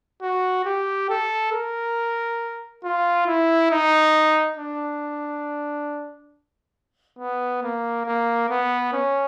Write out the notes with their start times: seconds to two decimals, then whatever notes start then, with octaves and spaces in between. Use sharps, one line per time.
0.22 F#4
0.65 G4
1.09 A4
1.53 A#4
2.84 F4
3.27 E4
3.71 D#4
4.57 D4
7.19 B3
7.63 A#3
8.06 A#3
8.49 B3
8.93 C#4